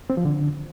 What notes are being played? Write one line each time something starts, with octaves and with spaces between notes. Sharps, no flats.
C4
F3
D3